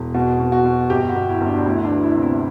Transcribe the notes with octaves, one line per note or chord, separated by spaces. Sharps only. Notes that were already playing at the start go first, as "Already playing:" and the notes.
Already playing: E1
B2 F#4
B2
F#4
B2
G1 G4
F#4
G1
E4
G1
D4
D4
D2 E4
D4
E3
E4
C3
E4